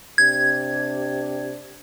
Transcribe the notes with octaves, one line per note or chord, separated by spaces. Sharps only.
C3 D4 G4 G#6